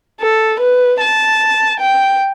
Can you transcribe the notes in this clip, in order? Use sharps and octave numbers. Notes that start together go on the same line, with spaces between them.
A4
B4
A5
G5